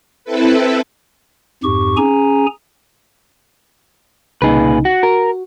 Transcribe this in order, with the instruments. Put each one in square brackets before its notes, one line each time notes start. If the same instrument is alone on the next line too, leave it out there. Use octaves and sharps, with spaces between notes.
[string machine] C4 E4 A4 B4
[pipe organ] F2 G#2 G4 C#6
C#4 G#4 G#5 A#5
[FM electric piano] C2 C#3 D#4 [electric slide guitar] A#2 G#4 B4
[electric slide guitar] F#4
[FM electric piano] F#4 [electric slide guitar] A#4